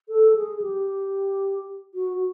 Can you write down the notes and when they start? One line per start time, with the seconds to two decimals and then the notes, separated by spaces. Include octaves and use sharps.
0.09 A4
0.35 G#4
0.62 G4
1.94 F#4